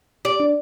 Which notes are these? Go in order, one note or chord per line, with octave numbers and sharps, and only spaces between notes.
G4 D5
D4